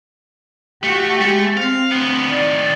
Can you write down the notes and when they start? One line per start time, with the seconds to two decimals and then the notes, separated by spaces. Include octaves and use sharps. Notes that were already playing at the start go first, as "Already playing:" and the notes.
0.83 A3 F#4 G4
1.21 G#3 A3
1.57 C4 F5
1.91 D2 B3
2.31 A2 D#3 D5